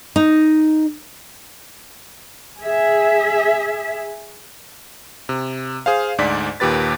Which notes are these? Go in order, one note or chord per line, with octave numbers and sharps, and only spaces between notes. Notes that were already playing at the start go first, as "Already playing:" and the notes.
D#4
G#4 E5
C3
G#4 C5 F5
D2 G#2 D5 B6
D#2 A#2 G4 B4 A6